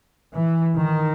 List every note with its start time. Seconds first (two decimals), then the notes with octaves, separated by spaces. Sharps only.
0.35 E3
0.76 D#3